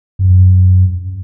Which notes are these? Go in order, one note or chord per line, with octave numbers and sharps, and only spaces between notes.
F#2